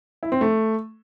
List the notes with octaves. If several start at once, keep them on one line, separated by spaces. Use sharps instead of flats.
E4
C4
A3